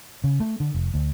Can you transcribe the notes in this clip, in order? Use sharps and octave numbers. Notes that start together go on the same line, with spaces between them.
C#3
A3
D3
F1
D2